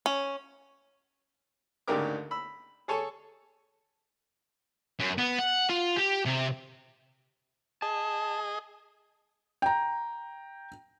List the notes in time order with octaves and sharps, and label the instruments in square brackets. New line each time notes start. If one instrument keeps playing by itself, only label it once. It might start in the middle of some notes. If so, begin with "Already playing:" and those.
[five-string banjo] C#4
[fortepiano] D2 G#2 C#3 G4 A#4 D6
B5 E6
G#4 A4 C#5 G#5 A5 C#6
[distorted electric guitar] F#2
B3
F#5
F4
G4
C3
[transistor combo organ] G#4 D#5 [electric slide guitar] A5
[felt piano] G5 A#5